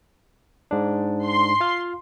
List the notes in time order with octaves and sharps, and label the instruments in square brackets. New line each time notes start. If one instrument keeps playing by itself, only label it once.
[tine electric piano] G#2 D4
[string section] C6
[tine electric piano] F4 F5